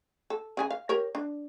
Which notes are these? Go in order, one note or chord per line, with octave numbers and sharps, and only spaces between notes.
A4
C#3 G#4 G#5
F5
G4 A#4 C#5
D4